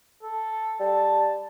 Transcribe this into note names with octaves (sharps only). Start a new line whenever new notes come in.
A4
G3 A5